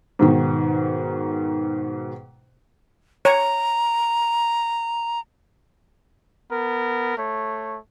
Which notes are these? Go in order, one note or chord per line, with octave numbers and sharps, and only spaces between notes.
G#2 B2 D#3
C#5 A#5
B3 A#4
A3 C#5